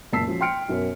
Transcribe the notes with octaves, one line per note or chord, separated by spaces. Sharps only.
F#1 A#2 A5 E6 B6 C7
F3 C#4 F#4
G5 C6 F6 C#7 D7
B1 F#2 A#4 C#5